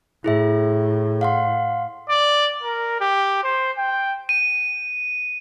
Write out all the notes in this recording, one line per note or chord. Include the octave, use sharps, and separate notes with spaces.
A2 E4 G#4 E5
F5 F#5 C6
D5
A#4
G4
C5
G5
D#7